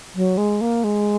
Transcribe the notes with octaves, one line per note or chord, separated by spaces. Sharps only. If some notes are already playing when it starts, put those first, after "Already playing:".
F#3
G#3
A#3
G#3